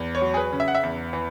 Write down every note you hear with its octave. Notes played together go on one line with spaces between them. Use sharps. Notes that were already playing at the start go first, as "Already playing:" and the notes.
Already playing: E2
C#5
F#3
G#4
B4
C#3
E5
F#5
E5
E2
E3